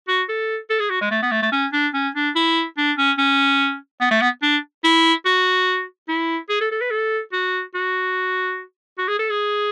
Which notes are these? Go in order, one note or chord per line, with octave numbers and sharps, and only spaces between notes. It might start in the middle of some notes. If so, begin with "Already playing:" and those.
F#4
A4
A4
G#4
F#4
G#3
A3
B3
A3
A3
C#4
D4
C#4
D4
E4
D4
C#4
C#4
B3
A3
B3
D4
E4
F#4
E4
G#4
A4
A4
B4
A4
F#4
F#4
F#4
G#4
A4
G#4